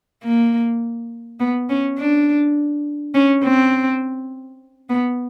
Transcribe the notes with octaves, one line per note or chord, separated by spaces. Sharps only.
A#3
B3
C#4
D4
C#4
C4
B3